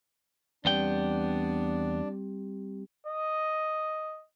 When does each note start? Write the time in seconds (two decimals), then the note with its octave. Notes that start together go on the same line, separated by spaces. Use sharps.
0.65 E2 G3 B3 C4 D4 G4 D5 G5
3.07 D#5